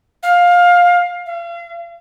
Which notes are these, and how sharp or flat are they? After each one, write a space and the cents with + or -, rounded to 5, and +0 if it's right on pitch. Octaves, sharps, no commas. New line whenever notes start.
F5 +15
F5 -35